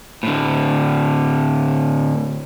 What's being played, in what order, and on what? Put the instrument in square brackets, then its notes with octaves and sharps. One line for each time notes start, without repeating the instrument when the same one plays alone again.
[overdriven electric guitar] A2 D3